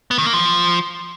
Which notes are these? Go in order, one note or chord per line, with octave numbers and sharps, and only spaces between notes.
B3
D#3
A#3
F3